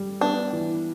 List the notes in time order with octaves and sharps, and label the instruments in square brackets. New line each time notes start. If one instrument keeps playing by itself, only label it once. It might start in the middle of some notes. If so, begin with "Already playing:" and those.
Already playing: [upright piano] G3
[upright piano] B3 [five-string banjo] D4
[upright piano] E3